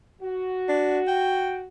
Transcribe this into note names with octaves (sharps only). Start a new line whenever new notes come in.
F#4
D4
G5